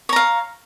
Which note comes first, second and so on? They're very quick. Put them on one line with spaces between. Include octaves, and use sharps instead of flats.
C#5 A#5 F5